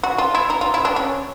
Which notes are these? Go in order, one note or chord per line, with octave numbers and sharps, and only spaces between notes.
F#4
F4
E4
D#4
F4
E4
D4
C#4